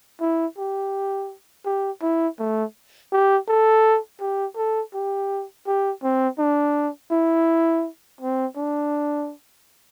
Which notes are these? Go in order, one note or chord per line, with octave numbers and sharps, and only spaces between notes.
E4
G4
G4
E4
A3
G4
A4
G4
A4
G4
G4
C4
D4
E4
C4
D4